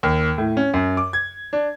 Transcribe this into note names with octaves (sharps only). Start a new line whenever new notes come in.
D#2
A2
C#4
F#2
D6
G#6
D4